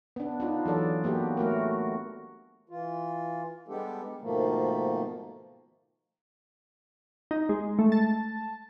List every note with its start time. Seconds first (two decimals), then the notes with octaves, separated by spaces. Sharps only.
0.16 B3 D4
0.40 D4 D#4 F4
0.65 E3 F#3 A4 D5
1.04 A#3 B3 F#4 G4
1.37 A3 F#4 A#4
2.69 E3 F4
3.68 G3 G#3 B3 D4 G4 A4
4.22 G#2 B2 D#3 F3 A3 A#3
7.31 D#4
7.49 G#3
7.79 A3
7.92 A5